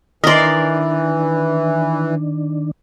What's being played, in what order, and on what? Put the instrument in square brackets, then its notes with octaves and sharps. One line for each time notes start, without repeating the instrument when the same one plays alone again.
[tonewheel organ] D#3 D4 [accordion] E3 [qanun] A#4 D5 [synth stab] D#5 C6